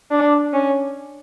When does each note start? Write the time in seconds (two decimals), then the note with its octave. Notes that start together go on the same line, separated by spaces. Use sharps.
0.11 D4
0.53 C#4